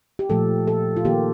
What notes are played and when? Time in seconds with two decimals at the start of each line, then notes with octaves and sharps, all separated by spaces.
0.19 G4
0.30 A#2 F3 A3 A4
0.67 A4
0.97 F4
1.05 D#3 A#3 G4